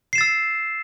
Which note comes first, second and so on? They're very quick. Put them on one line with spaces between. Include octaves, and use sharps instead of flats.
C7 E7 A6 E6